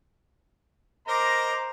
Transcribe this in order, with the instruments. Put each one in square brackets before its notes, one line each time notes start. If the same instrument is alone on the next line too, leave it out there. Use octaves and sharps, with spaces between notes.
[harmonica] A#4 D#5 A#5 [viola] C5 D6